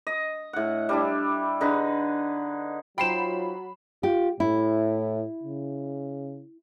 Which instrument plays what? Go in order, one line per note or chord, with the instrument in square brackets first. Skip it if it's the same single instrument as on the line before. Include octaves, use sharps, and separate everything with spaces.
[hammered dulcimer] D#5
A2 F#5
G3 D4 E4
D3 D#4 G#4 B4
[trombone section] F#3 [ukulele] D#4 C5 G5 [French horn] F4 [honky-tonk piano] B5 C7 E7
[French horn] F4 [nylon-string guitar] G4
[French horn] A2 [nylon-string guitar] E4
[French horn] C#3